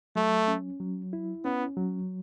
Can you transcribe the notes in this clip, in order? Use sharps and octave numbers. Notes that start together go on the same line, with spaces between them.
F#3 A3
C#4
F#3
E4
B3 C#4
F#3